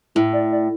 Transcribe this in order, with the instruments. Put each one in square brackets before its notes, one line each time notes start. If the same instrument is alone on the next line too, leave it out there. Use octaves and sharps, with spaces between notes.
[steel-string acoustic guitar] A2 [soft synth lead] E4
[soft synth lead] D5
D5